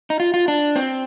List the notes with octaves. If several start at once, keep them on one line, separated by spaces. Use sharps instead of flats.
D#4
F4
F4
D4
C4